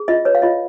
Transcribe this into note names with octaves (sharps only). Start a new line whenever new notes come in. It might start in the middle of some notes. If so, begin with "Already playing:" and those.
Already playing: G#4
F4 D#5
B4 C#5
F5
F4 D#5